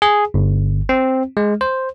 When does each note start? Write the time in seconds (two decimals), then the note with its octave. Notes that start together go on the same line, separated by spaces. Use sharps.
0.02 G#4
0.34 G1
0.89 C4
1.37 G#3
1.61 C5